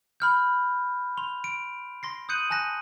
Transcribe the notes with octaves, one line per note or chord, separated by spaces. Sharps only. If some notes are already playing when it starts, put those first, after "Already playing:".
B5 F6 G6
C6 F7
D7
C6 A#6 C7
D#6 F#6 G6 C#7 D#7 F#7
G#5 A5 F#6 A#6